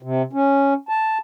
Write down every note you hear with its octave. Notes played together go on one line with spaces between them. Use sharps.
C3
C#4
A5